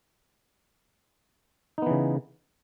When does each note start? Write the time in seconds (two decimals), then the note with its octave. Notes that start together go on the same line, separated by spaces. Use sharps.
1.78 D#4
1.82 B3
1.86 E3
1.91 C#3